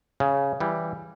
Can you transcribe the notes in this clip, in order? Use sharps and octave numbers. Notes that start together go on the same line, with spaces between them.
C#3
E3 G3